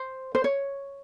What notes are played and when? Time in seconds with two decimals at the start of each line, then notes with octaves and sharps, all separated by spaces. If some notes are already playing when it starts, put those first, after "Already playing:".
Already playing: C5
0.35 C5
0.44 C#5